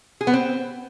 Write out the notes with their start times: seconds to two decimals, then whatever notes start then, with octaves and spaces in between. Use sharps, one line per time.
0.21 G#4
0.27 B3
0.33 C4